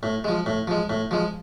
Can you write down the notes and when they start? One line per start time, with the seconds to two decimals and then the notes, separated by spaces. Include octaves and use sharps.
0.03 A2
0.24 F3 G#3
0.46 A2
0.67 F3 G#3
0.90 A2
1.11 F3 G#3